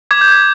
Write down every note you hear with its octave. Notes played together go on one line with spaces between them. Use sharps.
D6 G#6
G6
D6 G#6